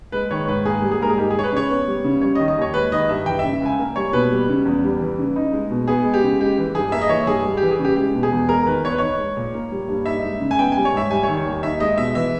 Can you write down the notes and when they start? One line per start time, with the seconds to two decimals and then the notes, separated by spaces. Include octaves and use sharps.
0.12 G#3 B4
0.31 D#3 C#5
0.48 G#2 B4
0.65 A#3 G#4
0.82 G3
0.92 G#4
1.00 G#2 A#4
1.09 G#4
1.18 D#4 G4
1.30 G#4
1.36 G#3 C#5
1.43 B4
1.52 C#3 C#5
1.70 B3
1.87 G3
2.04 C#3
2.22 G3 C#5
2.35 D#5
2.39 D#3
2.48 D#5
2.57 D#2 C#5
2.74 G#3 B4
2.92 D#3 D#5
3.09 G2 E5
3.26 E3 G5
3.39 E5
3.44 C#3
3.62 C#2 G#5
3.79 A#3
3.96 G3 C#5
4.13 B2 B4
4.31 G3
4.49 C#3
4.65 E2
4.84 G3
5.00 E3
5.18 C#3
5.36 D#4
5.53 G#3
5.71 B2
5.88 B3 G#4
6.05 G#3
6.14 G4
6.23 C#3
6.40 G#3 G4
6.58 E3
6.75 G2 G#4
6.92 A#3 E5
7.02 D#5
7.09 E3 C#5
7.27 G2 G#4
7.45 G3
7.57 G4
7.63 E3
7.71 G#4
7.79 C#3
7.85 G4
7.96 G#3 G4
8.15 B2
8.23 G#4
8.31 E2
8.49 G#3 A#4
8.67 D#3 B4
8.84 E2 C#5
8.92 B4
8.98 D#4 C#5
9.18 G#3
9.37 A#2
9.54 A#3
9.71 G3
9.89 G2
10.06 D#4 E5
10.24 G#3
10.40 C#3
10.51 G#5
10.59 B3 G5
10.72 G3 G#5
10.85 C#5
10.93 G#2 E5
11.11 G3 G#5
11.23 C#5
11.28 D#3
11.37 C#5
11.45 D#2
11.63 D#4 E5
11.80 G#3 D#5
11.97 B2 E5
12.15 E3 E5